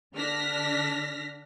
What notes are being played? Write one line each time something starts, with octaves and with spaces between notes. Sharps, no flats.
D3 D4 F6 A#6 B6